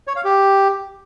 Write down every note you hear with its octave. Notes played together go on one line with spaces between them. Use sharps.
C#5
F5
G4